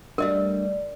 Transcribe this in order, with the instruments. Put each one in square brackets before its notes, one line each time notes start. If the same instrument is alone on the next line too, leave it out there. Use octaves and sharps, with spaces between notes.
[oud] G3 A3 [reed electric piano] D4 [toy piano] A#4 D#5 [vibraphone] D5